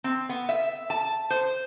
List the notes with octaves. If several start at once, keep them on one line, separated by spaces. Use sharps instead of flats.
C4
B3
E5
A5
C5